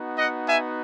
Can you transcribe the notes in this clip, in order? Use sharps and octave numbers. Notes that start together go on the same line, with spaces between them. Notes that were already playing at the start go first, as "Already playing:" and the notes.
Already playing: B3 D#4 F#4
D#5 F#5
E5 G#5